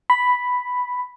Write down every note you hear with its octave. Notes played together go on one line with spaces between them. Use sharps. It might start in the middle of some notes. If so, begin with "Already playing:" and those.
B5